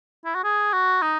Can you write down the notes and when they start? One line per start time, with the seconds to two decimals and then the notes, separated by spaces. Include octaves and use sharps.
0.25 E4
0.35 F#4
0.44 G#4
0.73 F#4
1.02 D#4